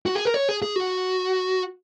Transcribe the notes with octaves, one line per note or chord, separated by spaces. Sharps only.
F#4
G#4
A#4
C#5
G#4
G#4
F#4